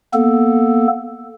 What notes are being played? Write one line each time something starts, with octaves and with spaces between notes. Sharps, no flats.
A#3 B3 A4